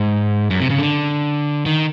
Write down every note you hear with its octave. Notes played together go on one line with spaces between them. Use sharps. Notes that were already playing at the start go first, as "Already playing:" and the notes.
Already playing: G#2
F#2
C3
C#3
D3
D#3